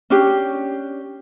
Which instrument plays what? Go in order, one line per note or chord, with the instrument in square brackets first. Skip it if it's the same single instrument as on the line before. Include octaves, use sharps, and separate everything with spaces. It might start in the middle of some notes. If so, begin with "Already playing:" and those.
[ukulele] C#4 D4 G4